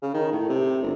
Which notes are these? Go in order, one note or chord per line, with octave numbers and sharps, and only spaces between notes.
C#3
D#3
A2
C3
G1